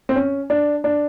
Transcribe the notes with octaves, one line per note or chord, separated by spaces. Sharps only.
C4
C#4
D4
D4